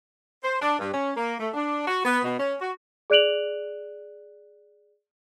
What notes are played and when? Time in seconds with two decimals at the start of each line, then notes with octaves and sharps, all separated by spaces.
0.44 C5
0.60 D4
0.79 G2
0.93 C#4
1.16 A#3
1.40 A3
1.54 D4
1.87 F#4
2.05 B3
2.24 B2
2.39 C#4
2.61 F#4
3.10 G#4 D5 F#6 D7 F7 F#7